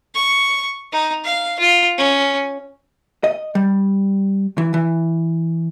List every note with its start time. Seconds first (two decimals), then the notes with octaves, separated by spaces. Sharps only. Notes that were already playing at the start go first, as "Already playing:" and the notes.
0.15 C#6
0.92 D#4
1.24 F5
1.59 F4
1.98 C#4
3.24 D#5
3.55 G3
4.58 E3
4.74 E3